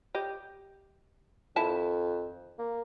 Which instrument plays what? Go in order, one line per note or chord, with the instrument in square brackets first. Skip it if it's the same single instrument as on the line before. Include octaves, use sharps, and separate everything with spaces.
[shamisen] G4 D#5
[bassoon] F2 [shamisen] D#3 E4 A5
[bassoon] A#3